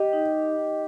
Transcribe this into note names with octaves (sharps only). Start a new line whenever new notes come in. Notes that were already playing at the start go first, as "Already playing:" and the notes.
Already playing: G4 D#5
D#4
D#5
D#4